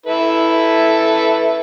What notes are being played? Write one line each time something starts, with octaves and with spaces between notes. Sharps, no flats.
E4 A4 B4